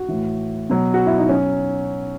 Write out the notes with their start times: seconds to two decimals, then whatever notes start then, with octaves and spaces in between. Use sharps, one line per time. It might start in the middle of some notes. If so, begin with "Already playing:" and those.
Already playing: F#4
0.09 A2 E3
0.70 B2 F#3
0.94 F#4
1.06 E4
1.18 D#4
1.29 B2 F#3 C#4